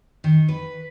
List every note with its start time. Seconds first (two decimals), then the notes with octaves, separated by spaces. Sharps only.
0.24 D#3
0.48 B4